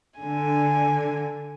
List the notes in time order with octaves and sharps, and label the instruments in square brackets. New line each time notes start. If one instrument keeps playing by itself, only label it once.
[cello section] D3 [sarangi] G#5